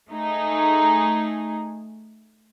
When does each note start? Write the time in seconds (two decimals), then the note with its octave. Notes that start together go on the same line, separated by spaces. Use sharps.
0.10 A3 D#4 G#4